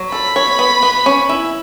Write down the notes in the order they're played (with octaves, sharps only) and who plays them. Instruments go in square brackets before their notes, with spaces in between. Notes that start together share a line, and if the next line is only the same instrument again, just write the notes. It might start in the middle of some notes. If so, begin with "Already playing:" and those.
Already playing: [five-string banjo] F#3
[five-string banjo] A4 [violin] B5
[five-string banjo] C#5
B3
B3
C#4
E4